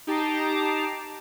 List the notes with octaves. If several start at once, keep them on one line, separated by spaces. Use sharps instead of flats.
D#4 G4 A5 A#5 D6 C7